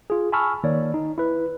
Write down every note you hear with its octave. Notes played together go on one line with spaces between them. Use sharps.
F4 G#4
G#5 A5 B5 C#6 E6 F6
D#3 A#3 C#5 D5
D#4
E4 B4